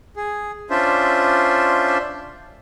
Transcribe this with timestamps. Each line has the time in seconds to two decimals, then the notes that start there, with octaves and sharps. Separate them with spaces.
0.16 G#4
0.70 C#4 D4 F4 C5 D5 E5